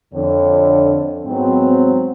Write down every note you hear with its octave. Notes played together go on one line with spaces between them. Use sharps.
F2 D3 C#5
G#2 F#3 B3 C4